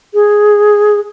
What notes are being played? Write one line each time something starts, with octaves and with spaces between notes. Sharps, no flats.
G#4